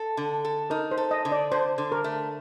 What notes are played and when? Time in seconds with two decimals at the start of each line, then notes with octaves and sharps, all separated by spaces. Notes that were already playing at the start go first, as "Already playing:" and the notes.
Already playing: A4
0.17 D3
0.45 A4
0.70 D#4 A#4
0.91 C5
0.97 A4
1.11 D#5
1.25 D3
1.32 D5
1.52 D3 C5
1.78 D3
1.92 A#4
2.04 A3